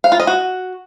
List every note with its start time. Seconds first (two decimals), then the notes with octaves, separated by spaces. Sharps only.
0.04 F5
0.12 F4
0.20 D#5
0.27 F#4